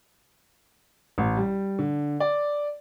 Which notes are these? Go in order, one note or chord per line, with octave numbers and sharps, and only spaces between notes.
A1
G3
D3
D5